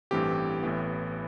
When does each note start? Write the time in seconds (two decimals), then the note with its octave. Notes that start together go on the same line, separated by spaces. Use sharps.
0.11 A1 G2 E3 A3 C4 G4
0.62 A1 A2 E3 B3